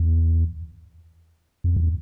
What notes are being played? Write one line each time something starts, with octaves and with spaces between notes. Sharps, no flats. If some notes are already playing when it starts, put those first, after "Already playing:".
Already playing: E2
F2
E2